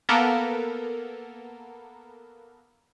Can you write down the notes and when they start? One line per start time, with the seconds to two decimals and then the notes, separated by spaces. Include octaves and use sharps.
0.09 A#3 B3 A4 A#4